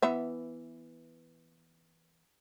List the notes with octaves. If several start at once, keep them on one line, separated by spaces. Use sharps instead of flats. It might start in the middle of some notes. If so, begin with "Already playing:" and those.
E3 B3 E5